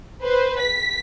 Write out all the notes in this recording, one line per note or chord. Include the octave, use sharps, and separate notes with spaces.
B4 C5
B6